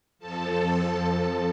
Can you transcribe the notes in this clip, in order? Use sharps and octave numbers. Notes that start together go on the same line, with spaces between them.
F2 F3 A4 A5